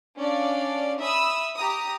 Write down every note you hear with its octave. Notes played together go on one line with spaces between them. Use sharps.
C#4 D4 D5 F5
E5 B5 D#6 E6
G4 A#5 D#6